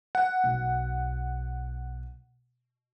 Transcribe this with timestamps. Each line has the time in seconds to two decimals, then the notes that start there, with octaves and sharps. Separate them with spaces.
0.15 F#5
0.44 B1